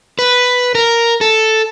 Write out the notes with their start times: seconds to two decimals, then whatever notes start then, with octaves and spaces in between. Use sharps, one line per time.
0.19 B4
0.75 A#4
1.21 A4